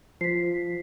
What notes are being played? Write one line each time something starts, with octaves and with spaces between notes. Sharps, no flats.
F3 B6 C7